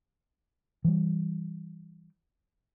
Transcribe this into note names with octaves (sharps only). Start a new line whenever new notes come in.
E3 G3